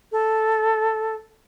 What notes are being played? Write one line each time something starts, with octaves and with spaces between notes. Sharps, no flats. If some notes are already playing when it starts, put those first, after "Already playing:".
A4